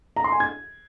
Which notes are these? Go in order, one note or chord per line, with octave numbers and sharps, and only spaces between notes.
A#5
C6
G#5
G#6